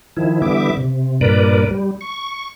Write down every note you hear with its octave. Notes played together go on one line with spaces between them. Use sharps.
D#3 F3 E4
D3 E3 G3 B3 E5 D6
C3
G2 A#2 A#4 B4 D5
G3
C#6